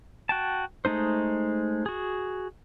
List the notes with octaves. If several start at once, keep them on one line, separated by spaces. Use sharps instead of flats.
F#4 G5 A5
G#3 A3 D#4 C5
F#4 G#4